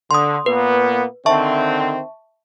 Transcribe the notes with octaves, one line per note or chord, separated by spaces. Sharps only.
D3 C6 D#6
A#2 A#3 B3 B4
D3 D#3 C4 E5 A5 C#6